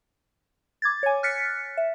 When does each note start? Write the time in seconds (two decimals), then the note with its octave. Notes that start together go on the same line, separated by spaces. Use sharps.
0.82 D6 G#6 A6
1.03 C#5 G#5
1.23 F6 F#6 A6 B6 C#7
1.77 E5